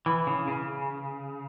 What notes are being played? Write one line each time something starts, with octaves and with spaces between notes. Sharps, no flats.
E3
C#3
C#3